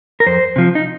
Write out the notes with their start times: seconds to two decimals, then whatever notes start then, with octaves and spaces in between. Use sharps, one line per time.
0.20 A#4
0.26 F2 C5
0.56 C3 F3
0.75 D#4